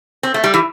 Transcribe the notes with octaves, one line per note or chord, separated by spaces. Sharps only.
C4
A3
G3
E3